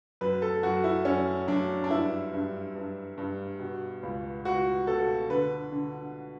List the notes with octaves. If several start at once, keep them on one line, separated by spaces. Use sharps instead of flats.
F#2 B4
A4
F#2 F#4
E4
F#2 C#4
F#2 D4
D4
G2 E4
G2
G2
G2
B2
C#2
C#2 F#4
B2 A4
D3 B4
D3